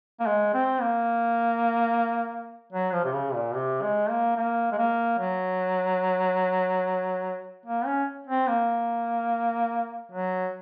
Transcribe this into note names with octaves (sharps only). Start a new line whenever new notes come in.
A#3
G#3
C4
A#3
F#3
F3
C3
C#3
A#2
C3
G#3
A#3
A#3
G#3
A#3
F#3
A#3
C#4
C4
A#3
F#3